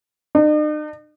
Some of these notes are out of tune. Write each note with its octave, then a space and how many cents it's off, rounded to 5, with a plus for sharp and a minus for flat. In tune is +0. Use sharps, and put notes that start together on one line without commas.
D#4 -45